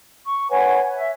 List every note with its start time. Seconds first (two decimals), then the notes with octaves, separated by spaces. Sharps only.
0.25 C#6
0.49 B4 C#5 F#5 G#5
0.94 E5